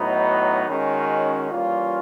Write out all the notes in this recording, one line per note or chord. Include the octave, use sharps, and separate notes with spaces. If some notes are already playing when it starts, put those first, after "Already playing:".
Already playing: A2 F#3 B3 D#4
D#3 G#3 C#4 F#4
E3 G3 A#3 C#4 F4